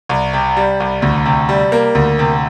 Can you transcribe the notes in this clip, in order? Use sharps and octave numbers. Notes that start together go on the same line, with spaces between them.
C2
C3
G3
C2
D2
C3
G3
A#3
D2
C3